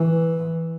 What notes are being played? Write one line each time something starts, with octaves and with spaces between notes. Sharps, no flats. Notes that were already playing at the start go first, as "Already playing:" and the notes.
Already playing: E3